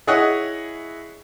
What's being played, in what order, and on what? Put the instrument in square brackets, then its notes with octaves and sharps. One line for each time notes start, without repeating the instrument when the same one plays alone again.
[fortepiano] E4 G#4 C#5 D#5 F#5